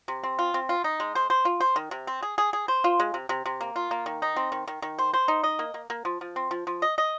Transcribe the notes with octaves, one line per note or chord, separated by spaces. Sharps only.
C3
C4
F4
C4
F4
D#4
G#3
C5
C5
F4
C5
D#3
C3
C4
G#4
G#4
G#4
C5
F4
G#3
C3
C3
C3
A#3
F4
A#3
D#3
D#4
C4
D#3
D#3
D#3
C5
C5
D#4
D#5
A#3
A#3
A#3
F3
F3
C4
F3
F3
D#5
D#5